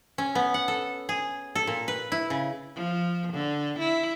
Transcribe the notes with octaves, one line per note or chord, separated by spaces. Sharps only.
C#4
B3
F#5
A4
G#4
A4
A#2
B4
E4
C#3
F3
D3
E4